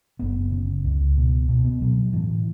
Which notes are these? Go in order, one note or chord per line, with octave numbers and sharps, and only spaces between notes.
F#1 B3
C#3
C#2
B2
B2
B3
B2 F#3
F#3
A2 E3